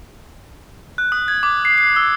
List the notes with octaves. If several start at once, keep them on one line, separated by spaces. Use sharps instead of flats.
F#6
D#6
G#6
D6
C7
C7
E6